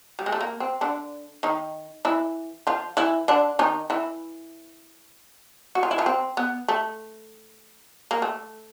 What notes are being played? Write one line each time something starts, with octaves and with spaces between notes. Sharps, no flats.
G3
G#3
A3
A#3
C4
D3 D4
D#3 D#4
E3 E4
F3 F4
E3 E4
D3 D4
D#3 D#4
E3 E4
F#4
F4
E4
F3 F4
C4
B3
A3
A#3
A3